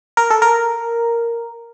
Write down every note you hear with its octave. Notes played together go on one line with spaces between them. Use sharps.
A#4
A4
A#4